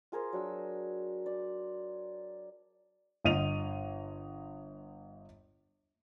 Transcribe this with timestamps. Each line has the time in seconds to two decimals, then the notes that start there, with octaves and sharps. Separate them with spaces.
0.12 F4 G#4 A#4 C5
0.33 F#3 D4 E6
1.26 D5
3.25 G1 D#5 D#7 F7